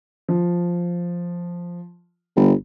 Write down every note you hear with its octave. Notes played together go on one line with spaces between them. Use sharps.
F3
G1